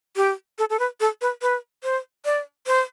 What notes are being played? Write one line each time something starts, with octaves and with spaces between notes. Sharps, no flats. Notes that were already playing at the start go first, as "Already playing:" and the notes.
G4
A4
A4
B4
A4
B4
B4
C5
D5
C5